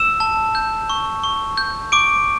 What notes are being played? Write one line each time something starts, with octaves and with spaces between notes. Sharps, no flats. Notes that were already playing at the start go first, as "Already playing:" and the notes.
Already playing: E6 E7
A5
G6
C#6
C#6
G6
C#6 D6 D7